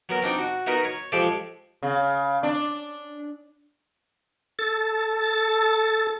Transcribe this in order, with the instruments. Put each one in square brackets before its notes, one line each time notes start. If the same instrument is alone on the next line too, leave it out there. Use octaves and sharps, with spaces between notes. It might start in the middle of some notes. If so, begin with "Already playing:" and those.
[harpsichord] F#3 B3 A#4
C4 D4 D#4 D5
F#4
B3 D#4 F#4 A#4 B4
C#5
F3 G#3 G4 A4 C5 D5
[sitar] C#3
D4
[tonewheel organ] A4 A6